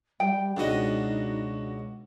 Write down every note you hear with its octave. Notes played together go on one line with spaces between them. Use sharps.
G3 G5
C#2 B2 D4 D#4 F#4 D#5